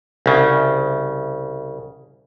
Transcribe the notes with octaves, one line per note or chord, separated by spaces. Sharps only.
C2 C#3